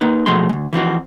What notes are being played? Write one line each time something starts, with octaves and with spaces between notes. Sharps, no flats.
A#3 D#4 B4
B2 F3 F#3 G#3 A3 C6
D2 G#3
E3 F3 C4 F#4